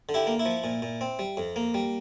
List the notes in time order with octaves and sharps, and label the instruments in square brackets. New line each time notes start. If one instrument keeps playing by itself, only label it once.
[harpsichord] D3
E4 G4
A#3
E4
F3
A#2
A#2
C4
G3
F2
A#3
G3